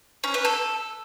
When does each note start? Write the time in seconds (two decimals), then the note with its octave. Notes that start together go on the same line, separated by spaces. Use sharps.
0.24 C#4
0.34 B4
0.45 A4